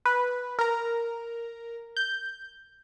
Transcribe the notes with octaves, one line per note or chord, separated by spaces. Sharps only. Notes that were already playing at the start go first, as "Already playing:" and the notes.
B4
A#4 A#5
G6